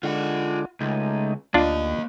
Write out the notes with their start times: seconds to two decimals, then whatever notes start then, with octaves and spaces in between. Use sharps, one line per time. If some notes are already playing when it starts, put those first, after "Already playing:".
0.03 D3 G#3 D4 F4 F#5
0.81 C#2 G#3 A3 D#4
1.54 D2 A#3 D4 F4 D#5